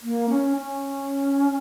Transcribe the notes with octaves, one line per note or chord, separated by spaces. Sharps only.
A#3
C#4
C#4